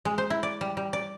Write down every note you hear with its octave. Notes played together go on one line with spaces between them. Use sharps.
G#3
C5
E4
D5
G3
G3
D5